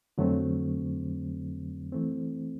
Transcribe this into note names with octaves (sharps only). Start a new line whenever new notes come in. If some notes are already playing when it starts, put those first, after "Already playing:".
F2 D3 F#3 A3 C4
E3 A3 C4